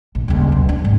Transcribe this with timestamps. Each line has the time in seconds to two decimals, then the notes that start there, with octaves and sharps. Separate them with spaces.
0.15 A#1
0.28 D#1 C#2
0.52 B1
0.69 D4
0.85 G#1